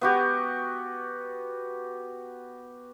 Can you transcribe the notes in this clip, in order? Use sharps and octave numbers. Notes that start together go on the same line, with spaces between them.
B3 F#4 G4